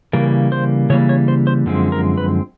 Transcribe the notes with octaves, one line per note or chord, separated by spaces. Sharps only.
C#3 E3 G3 A#3 A#4
C5
C#3 E3 G3 A#3 C#5
C#5
C5
C5
F#2 D3 F3 G#3 C4
A#4
B4